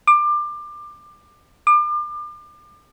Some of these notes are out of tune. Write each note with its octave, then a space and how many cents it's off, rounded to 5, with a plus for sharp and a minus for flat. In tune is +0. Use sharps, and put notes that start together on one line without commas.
D6 +25
D6 +35